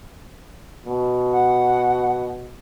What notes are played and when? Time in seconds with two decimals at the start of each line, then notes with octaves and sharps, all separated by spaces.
0.86 B2
1.32 F#5